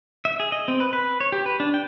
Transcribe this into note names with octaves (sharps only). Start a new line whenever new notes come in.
E5
G#4
D#5
C4
B4
B4
C#5
G4
B4
D4
G5